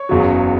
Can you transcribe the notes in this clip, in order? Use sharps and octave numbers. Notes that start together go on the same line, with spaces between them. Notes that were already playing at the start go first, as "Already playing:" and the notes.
Already playing: C#5
F#1 E2 C#3 F#3